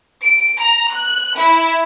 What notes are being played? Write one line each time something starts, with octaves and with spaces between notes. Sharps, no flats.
D7
A#5
F#6
E4